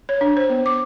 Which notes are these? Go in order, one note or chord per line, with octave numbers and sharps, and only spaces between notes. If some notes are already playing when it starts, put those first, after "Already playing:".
C#5
D4
C5
B3
D6